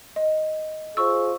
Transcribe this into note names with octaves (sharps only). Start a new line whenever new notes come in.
D#5
F4 G#4 C5 C#6 E6